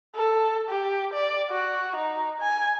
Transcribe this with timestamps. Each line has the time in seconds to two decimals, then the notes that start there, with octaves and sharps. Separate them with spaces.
0.15 A4
0.69 G4
1.13 D5
1.50 F#4
1.96 D#4
2.41 G#5